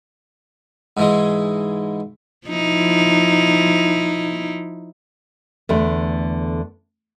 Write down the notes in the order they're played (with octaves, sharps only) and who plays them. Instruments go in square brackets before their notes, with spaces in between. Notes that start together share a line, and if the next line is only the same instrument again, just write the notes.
[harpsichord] G#2 E3 G#3
[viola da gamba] F3 D#4 E4
[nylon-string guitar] E2 D3 A3